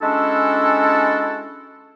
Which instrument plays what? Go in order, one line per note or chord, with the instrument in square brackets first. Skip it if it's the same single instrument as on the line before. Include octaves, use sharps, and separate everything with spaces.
[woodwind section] G#3 C#4 D4 E4 F#4 A4